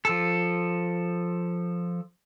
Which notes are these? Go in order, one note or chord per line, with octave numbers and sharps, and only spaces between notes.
F3 A4